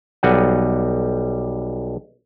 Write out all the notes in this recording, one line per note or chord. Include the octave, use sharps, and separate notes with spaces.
B1 G3 D#5 F#5